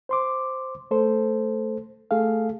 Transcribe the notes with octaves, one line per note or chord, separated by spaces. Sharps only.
C5 C6 D6
A3 A4 C5
A3 G#4 A4 F5